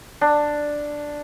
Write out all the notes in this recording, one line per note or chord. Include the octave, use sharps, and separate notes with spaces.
D4